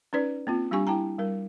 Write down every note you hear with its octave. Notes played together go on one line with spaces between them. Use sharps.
C#4 D#4 B4 D5
A#3 C4 F4
G3 D4 G4 G#5 C#6
E4 G5 A5 A#5
G3 A#4